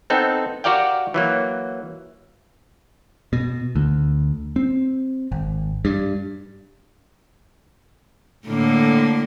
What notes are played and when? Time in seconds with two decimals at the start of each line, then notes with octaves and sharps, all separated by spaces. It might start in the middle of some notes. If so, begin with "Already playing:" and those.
0.10 B3 C4 D#4 A4
0.64 F#4 G4 A#4 D5 F5 G5
1.14 E3 F#3 A#3
3.33 B2
3.76 D2
4.56 C4
5.32 G#1
5.85 G2
8.46 A2 D3 A#3